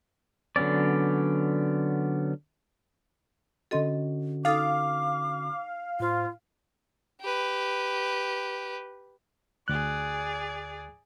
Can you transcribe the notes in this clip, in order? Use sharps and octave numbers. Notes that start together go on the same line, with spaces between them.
D3 F#3 B3 C#4 D5
D3 C#4 F#4 A4 D#5 C6
D#4 A4 F5 D6 D#6
A2 F4 C5 C6
G4 B4
D2 G#4 D5 F#6